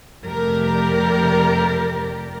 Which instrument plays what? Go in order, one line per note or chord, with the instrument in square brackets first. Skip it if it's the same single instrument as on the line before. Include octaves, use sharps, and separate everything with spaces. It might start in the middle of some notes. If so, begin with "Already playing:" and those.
[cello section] F2 C3 A3 G4 A#4 D5